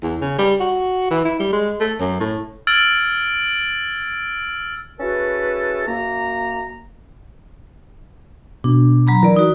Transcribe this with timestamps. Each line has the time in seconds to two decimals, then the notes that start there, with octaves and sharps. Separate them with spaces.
0.03 E2
0.22 C#3
0.39 G3
0.60 F#4
1.11 E3
1.25 E4
1.40 G3
1.53 G#3
1.80 A3
2.00 F#2
2.20 A2
2.67 E6 F6 G#6 A6 D7 F#7
5.00 C#4 E4 F#4 G#4 A4 B4
5.88 F#2 A#3 A#5
8.64 B2 D4
9.07 F#3 A#5 B5
9.23 E3 A#4 D5
9.36 D#4 F#4